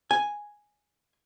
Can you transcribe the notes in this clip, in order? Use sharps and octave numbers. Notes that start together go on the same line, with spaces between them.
G#5